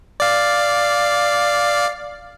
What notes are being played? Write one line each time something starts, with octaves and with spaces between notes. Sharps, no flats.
D5 F5